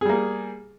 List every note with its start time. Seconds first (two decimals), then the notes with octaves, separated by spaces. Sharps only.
0.01 G#4
0.05 G3
0.09 A#3